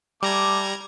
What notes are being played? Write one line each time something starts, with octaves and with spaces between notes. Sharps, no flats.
G3 A3 A#5 D6 G#6